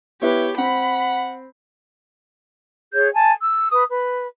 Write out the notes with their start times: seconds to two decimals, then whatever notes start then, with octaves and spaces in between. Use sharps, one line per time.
0.22 B3 E4 G4 B4 C#5
0.58 C4 F#5 B5
2.93 G#4 C#5 G6
3.13 G#5 A5
3.42 E6
3.71 B4 D#6
3.88 B4